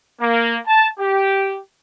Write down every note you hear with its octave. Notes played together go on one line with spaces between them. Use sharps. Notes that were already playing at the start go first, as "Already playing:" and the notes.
A#3
A5
G4